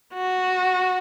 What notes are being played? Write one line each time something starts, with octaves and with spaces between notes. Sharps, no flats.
F#4